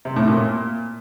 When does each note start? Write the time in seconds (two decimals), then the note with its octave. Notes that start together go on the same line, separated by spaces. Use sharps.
0.05 C3
0.16 A2
0.27 A#2